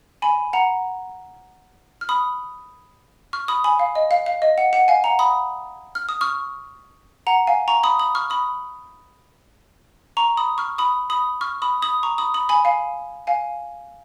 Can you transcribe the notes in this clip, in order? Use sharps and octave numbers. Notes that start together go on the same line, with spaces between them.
G#5 B5
F#5 A#5
F6
B5 D#6
C#6 F6
B5 D#6
G#5 B5
F5
D#5
F5
F5
D#5
F#5
F#5
F5 G#5
F#5 A#5
B5 D#6
F6
D#6
C#6 F6
F#5 A#5
F5 G#5
A#5 C#6
B5 D#6
B5 D#6
C#6 F6
B5 D#6
A#5 C#6
B5 D#6
C#6 F6
B5 D#6
B5 D#6
C#6 F6
B5 D#6
B5 D#6
A#5 C#6
B5 D#6
B5 D#6
G#5 B5
F5 G#5
F5 G#5